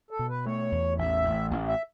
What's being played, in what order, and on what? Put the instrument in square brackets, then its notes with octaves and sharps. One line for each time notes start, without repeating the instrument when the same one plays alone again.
[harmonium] A4
[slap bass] B2
[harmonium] B4
[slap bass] A3 [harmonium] C#5
[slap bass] E2
[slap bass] A1 [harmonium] E5
[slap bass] A1
A1
[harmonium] E5